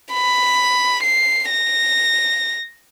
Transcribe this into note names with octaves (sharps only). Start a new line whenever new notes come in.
B5
C7
A#6